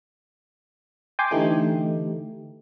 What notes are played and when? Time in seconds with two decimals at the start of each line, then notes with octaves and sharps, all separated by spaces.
1.19 G5 G#5 C6 D6
1.31 D3 E3 A3 D#4 G4